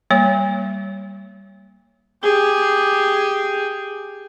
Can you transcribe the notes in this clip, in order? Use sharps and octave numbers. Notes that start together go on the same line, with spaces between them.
G3 A#3 C#5
G4 G#4